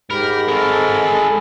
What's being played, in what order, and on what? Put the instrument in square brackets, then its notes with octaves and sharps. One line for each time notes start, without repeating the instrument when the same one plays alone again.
[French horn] G#2 [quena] G4 [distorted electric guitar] A#4 [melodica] B5
[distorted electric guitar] G#3 A#4 [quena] A4